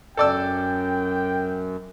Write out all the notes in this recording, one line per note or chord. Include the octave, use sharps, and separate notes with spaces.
F#2 A4 D5 G5 E6